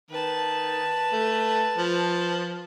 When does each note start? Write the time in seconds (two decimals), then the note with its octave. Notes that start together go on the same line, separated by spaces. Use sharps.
0.10 D#3 B4 A5
1.12 A3
1.78 F3